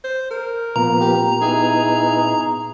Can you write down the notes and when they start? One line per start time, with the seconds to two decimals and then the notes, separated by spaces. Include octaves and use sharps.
0.04 C5
0.30 A#4
0.76 A#2 F3 A#3 B3 A#5
1.01 G4
1.42 B3 D#4 E4 G#4